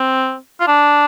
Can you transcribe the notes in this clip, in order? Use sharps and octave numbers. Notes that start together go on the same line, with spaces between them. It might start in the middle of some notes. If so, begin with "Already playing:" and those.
Already playing: C4
F4
D4